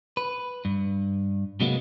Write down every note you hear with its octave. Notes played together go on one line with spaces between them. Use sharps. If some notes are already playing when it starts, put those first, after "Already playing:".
B4
G2
C3 F#3 G#3 A#3 B3